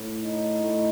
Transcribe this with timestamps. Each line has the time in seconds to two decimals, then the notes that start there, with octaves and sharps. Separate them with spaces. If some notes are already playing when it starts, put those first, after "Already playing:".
Already playing: A2
0.21 D#4
0.64 A2